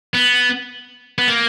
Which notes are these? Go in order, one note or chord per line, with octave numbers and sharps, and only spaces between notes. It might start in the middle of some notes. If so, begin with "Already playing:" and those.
B3
B3
A#3